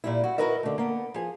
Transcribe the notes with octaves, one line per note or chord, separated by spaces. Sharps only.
A#2 G3 E4
F#4
E4 F#4 A#4 B4 D#5 E5
D3 A3
A#3 B3
F3 G#4